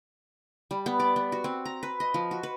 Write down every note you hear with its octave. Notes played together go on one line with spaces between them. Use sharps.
G3
B3
D5
B3
F#4
C4
A#5
B4
D#5
F3
F#4
B4